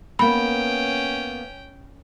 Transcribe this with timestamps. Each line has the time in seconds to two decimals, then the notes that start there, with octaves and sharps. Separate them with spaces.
0.19 A#3 B3 C#4 G5 B5